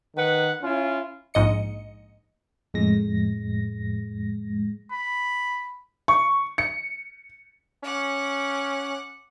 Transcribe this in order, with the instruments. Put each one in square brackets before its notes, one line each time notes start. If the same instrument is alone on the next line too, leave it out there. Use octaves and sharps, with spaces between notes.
[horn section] D#3 B4 F#5
C#4 E4 F4
[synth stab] A#1 G#2 D#5 C#7
[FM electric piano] F2 A2 G#3 A#6
[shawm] B5
[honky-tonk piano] C#6
C#7
[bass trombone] C#4 [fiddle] F#5 D6